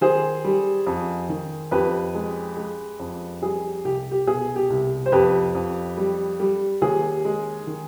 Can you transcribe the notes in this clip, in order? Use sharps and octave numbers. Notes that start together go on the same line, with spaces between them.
D#3 G#4 C5
G3
F2
D#3
F2 G4 B4
G#3
G#3
F2
G3 G#4
C2 G4
G4
B2 G#4
G4
C2
C5
F2 G4 B4
F2
G3
G3
D#2 G#4
G#3
D#3